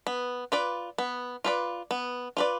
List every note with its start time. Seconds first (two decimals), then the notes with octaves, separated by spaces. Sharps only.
0.07 B3
0.52 F4 B4 D5
0.98 B3
1.44 F4 B4 D5
1.91 B3
2.37 F4 B4 D5